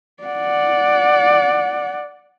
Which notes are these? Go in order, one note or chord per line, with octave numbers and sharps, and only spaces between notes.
D5 F#5